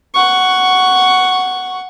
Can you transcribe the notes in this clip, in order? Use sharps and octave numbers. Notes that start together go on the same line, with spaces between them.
F#5 C#6